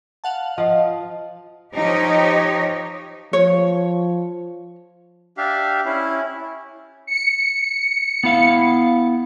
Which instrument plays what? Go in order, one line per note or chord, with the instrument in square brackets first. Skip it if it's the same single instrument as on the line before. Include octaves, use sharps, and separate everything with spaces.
[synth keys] F5 F#5 A5
[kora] F3 [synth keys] F4 [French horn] D#5
[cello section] F3 D#4 G4 C#5 D#5
[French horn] F3 [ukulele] C#5
[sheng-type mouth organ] D4 G4 E5 F5
C#4 E4
[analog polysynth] C#7
[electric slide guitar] B3 E4 F5